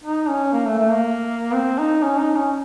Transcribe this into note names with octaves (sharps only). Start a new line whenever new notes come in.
D#4
C#4
A#3
A3
A3
A#3
C4
D#4
C#4
D#4
C#4